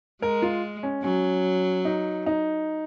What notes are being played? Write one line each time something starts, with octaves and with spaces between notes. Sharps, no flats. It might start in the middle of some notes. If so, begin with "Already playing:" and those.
G#3 A#4
F4
C#4
F#3 C#4
D#4
D#4